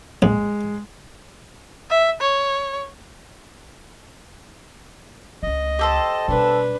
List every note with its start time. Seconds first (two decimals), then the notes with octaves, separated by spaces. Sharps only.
0.22 A#1 G#3
1.90 E5
2.21 C#5
5.43 C#2 A3 D#5
5.79 G4 A4 C5
6.28 B2 G3 D4 B4